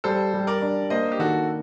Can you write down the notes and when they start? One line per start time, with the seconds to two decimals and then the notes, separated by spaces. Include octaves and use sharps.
0.04 G3 A4 C5
0.34 G3
0.47 A#4 D5
0.62 D4
0.90 A#3 C5 D#5
1.12 G4
1.19 D#3 F#4 A4